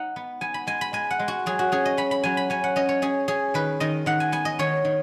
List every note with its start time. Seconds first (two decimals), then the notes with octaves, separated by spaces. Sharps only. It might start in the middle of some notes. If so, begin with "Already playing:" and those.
Already playing: D#4 F#5
0.16 B3
0.41 B3 G#5
0.54 B5
0.67 G#3 G#5
0.81 B5
0.93 G#3 G#5
1.11 F#5
1.19 G#3
1.28 F#4
1.46 F#3 G#4
1.59 F#4
1.72 C#4 G#4
1.85 D#5
1.97 C#4 B5
2.11 B5
2.24 F#3 G#5
2.37 B5
2.50 C#4 G#5
2.64 F#5
2.76 C#4 D#5
2.89 C#5
3.02 C#4 G#4
3.28 C#4 G#4
3.54 D#3 B4
3.80 D#3 D#5
4.06 D#3 F#5
4.20 G#5
4.32 B3 G#5
4.45 D#5
4.59 D#3 C#5
4.85 D#3